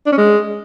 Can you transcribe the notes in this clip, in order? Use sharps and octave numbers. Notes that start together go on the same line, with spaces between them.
D4
C#4
G#3